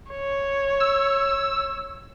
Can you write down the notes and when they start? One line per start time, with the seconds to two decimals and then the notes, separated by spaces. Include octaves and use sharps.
0.10 C#5
0.80 E6